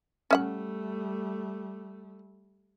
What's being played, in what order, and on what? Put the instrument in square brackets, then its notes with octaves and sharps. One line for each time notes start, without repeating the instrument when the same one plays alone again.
[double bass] G3 A3 [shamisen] C#4 E5 F#5